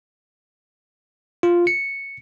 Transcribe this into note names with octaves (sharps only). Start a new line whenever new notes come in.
F4
C#7